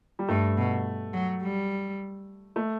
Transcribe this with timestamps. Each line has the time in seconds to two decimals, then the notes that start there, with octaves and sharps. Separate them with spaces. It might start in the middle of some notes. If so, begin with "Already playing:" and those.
0.19 G3
0.28 G2 A3
0.57 B2
1.14 F#3
1.42 G3
2.56 A3